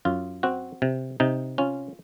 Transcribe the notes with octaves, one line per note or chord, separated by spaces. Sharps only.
F#2 F4
C4 F#4
C3
C3 D#4
C#4 F4